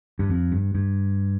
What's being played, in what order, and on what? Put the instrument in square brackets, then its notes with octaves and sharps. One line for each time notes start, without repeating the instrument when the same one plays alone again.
[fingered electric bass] G2
F2
G2
G2